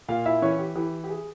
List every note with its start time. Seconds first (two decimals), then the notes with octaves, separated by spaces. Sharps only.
0.08 A#2 F4 F5
0.26 E4 E5
0.42 E3 C#4 C#5
0.59 G4
0.76 E3 G4
1.04 G4
1.09 G#4